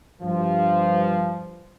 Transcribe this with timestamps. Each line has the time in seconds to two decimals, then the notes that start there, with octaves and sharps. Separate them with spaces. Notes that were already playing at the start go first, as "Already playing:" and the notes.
0.22 G2 F3